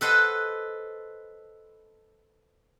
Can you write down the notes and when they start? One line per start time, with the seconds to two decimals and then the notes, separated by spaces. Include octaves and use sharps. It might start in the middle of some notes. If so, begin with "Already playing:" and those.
0.01 A4 B4 C5 D#5 F#5